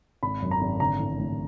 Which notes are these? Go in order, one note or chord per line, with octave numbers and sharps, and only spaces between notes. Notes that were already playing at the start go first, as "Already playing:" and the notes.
G#1 B5
F#2
A#5
G#1
D3 A#5
A1
A1